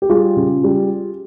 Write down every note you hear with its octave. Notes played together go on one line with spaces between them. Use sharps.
G4
G3 F4 G#4
C#3
G3